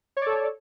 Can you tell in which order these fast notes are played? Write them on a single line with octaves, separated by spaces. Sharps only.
C#5 D5 A4